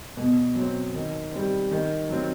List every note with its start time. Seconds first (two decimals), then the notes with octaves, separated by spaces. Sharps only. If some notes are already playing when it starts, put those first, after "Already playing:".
0.17 B2
0.55 F#3
0.60 C4
0.94 D#3
1.32 G3 C4
1.71 D#3
2.09 F#3 C4